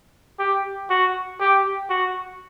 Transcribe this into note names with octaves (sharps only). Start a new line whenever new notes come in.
G4
F#4
G4
F#4